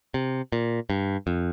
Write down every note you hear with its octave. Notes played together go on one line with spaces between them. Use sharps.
C3
A#2
G2
F2